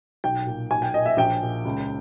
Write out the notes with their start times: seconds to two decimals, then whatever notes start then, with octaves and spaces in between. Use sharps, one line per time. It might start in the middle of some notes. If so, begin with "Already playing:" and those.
0.24 B1 G5
0.46 A#2
0.71 B1 G#5
0.82 G5
0.94 A#2 D#5
1.06 E5
1.17 A#1 G5
1.42 A#2
1.65 C#2